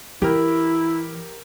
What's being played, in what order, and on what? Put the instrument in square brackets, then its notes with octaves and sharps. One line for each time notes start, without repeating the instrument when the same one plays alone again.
[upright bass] E3 [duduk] E4 [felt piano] G4 A#4